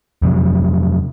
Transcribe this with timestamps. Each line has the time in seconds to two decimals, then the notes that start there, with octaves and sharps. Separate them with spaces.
0.22 F2 C3 F#3